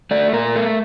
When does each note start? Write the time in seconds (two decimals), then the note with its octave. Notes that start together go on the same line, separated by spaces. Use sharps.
0.11 A3 D5
0.33 A#2 A#4
0.56 A3